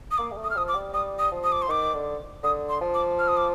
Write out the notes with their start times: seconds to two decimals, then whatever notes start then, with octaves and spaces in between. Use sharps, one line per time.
0.11 D#6
0.18 A#3 D6
0.31 G3
0.37 A3
0.44 D#6
0.50 F6
0.56 F3 D#6
0.68 D6
0.75 G3
0.93 G3 D#6
1.19 D#6
1.32 F3
1.44 D#6
1.52 D6
1.62 C6
1.68 D#3 D6
1.94 D3
2.44 D3 D#6
2.69 C6
2.81 F3
2.94 D6
3.19 F6
3.28 D#6
3.37 D6